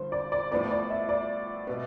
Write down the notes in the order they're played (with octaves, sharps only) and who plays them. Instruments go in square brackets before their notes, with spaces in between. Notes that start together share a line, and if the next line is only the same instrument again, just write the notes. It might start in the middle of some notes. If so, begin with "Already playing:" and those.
Already playing: [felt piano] G2 D3 F3 [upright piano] C5
[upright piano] D5
D5
[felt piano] A2 F3 B3 [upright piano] D5
[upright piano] D5
E5
D5
[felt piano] B2 B3